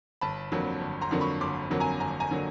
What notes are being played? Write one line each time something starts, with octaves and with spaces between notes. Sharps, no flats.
G1 A5 B5
F2 D3 F#3 A#3
G1
A#5 C6
F2 D3 F#3 A#3
B5 C#6
G1 C6 D6
F2 D3 F#3 A#3
G#5 A#5
G1 G#5 A#5
G#5 A#5
D3 F#3 A#3